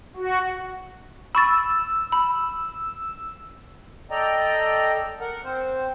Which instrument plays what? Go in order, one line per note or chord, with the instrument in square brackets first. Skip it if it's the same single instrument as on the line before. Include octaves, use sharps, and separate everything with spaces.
[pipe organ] F#4
[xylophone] B5 C#6 A6 [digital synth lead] E6
[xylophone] B5
[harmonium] A4 D5 D#5 G5 A#5
A#4 F#5
C4 C5